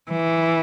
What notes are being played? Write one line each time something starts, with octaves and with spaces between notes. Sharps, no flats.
E3